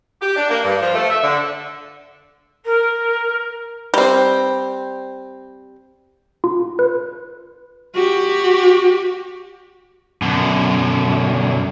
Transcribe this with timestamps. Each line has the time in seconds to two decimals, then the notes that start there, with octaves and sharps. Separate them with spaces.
0.21 G4
0.36 D4
0.50 A#3
0.64 G2
0.81 F3
0.95 A3
1.10 E5
1.23 D3
2.65 A#4
3.94 G3 C4
6.44 F4
6.79 B4
7.95 F#4 G4
10.22 F#2 B2 D3